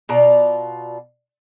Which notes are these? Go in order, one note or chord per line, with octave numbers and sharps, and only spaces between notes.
B2 F4 D5 A#5